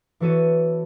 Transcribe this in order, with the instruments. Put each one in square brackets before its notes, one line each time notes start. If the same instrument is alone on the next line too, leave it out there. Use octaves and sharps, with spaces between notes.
[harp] E3 B3 F#4 A4 C#5 D#7